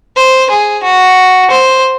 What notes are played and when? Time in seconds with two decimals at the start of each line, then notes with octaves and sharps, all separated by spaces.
0.16 C5
0.50 G#4
0.83 F#4
1.51 C5